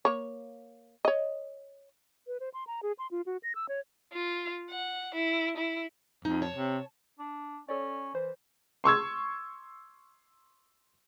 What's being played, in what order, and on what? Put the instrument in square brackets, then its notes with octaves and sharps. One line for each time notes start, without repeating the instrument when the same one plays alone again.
[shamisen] A#3 C#5
C#5 D#5
[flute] B4
C5
C6
A#5
G#4
C6
F4
F#4
A#6
E6
C#5
[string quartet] F4
F#5
E4
E4
[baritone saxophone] F2 [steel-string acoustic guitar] D#4
[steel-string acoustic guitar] C#5 A5
[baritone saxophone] C3
[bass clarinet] D4
[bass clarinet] C#4 [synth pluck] A4 C#5 D5
[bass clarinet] E3 [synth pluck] C5
[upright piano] C6 C#6 E6 G#6